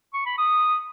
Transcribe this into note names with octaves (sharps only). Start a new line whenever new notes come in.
C#6
B5
D#6